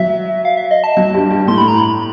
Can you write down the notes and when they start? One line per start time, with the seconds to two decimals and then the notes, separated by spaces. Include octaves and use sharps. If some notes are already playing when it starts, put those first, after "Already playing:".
Already playing: F#3 E5
0.45 F5
0.57 E5
0.71 D#5
0.84 A5
0.97 F#3
1.14 G2 G3
1.30 G2 G3
1.47 A2 A3 C6
1.58 B5
1.68 A#5
1.78 B5